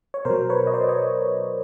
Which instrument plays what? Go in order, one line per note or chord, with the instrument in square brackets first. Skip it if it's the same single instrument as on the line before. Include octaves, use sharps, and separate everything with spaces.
[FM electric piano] C#5
B2 F#3 A#4 C5
B4 C#5
D#5
C5 D5
C#5 D#5